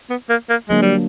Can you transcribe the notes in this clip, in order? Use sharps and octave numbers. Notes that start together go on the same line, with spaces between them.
B3
A#3
A#3
D3 F#3 G#3 A#3 D4
G3